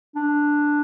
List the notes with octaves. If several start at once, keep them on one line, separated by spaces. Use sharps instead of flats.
D4